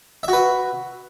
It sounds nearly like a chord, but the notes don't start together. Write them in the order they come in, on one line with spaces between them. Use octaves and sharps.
E5 F#4 B4